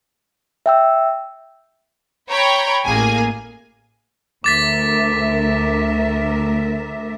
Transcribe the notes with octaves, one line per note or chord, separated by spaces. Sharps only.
E5 G5 E6
C#5 G5 A#5 B5
A1 A#3 G#4 G#5
D2 A#4 E5 D6 A6 B6